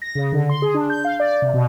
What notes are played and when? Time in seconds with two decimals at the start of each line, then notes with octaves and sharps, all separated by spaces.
0.02 A#6
0.15 C#3
0.32 D3
0.49 C6
0.62 G#4
0.74 D4
0.90 G6
1.05 F5
1.20 D5
1.42 C3
1.54 B2